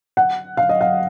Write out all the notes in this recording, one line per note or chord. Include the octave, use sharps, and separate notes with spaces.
F#5
F5
D#5
F5